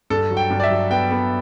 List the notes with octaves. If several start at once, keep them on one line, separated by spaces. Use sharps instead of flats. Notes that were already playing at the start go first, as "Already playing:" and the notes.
G2 A4
F#3
G5
G2
D5
E5
F#3
B3 G5
B3